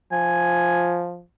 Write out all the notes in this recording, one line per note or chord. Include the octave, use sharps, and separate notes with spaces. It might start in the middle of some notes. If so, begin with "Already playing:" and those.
F3 G#5